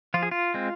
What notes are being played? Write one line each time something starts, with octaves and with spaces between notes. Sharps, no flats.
F3 F4
G#4
F4
G#3 C4